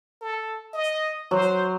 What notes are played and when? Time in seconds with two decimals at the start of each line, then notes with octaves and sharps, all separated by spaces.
0.21 A4
0.74 D#5
1.31 F#3 C5